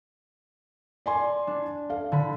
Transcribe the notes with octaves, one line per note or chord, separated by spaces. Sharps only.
D5 G#5 C6
D4
A4 F5
D3 B5